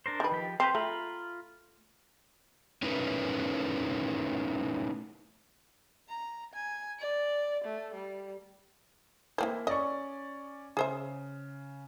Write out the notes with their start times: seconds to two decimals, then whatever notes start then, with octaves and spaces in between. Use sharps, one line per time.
0.06 D4 A#4 C5
0.20 D#3 B4
0.32 F3 G4
0.60 C4 B4 C5 F5
0.75 A3 F4 A#5 B5
2.83 A3 C#4 D#4 E4 A#4 B4
6.09 A#5
6.54 G#5
6.99 D5
7.64 A3
7.94 G3
9.38 E3 A#3 C4 E4 C5
9.67 C#4 D5 D#5 C#6
10.77 C#3 G#4 C5 E5